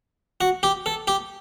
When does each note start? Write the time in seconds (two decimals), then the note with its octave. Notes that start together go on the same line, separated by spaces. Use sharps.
0.41 F#4
0.63 G4
0.86 A4
1.08 G4